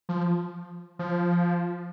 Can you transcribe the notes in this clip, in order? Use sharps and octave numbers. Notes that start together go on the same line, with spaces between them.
F3
F3